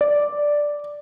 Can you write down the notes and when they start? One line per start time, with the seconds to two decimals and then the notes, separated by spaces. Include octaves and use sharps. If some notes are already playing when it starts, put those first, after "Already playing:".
0.01 D5